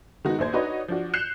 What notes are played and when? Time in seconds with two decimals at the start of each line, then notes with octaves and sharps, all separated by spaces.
0.25 D#3 G#3 B3 D#4 F#4
0.39 A#1 D#2 C5 G#6
0.53 D4 D#4 F#4 B4 C#5 D#5
0.88 F3 D4 F#4
1.14 F#6 G6 C7 C#7 E7 F7